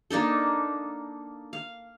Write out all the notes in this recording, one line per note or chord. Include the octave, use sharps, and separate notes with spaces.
A#3 D4 D#4 A4
F5